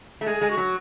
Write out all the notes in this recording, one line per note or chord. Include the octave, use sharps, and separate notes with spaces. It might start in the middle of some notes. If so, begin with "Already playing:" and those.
A3
G#3 G#4
G#3
F#4
F#3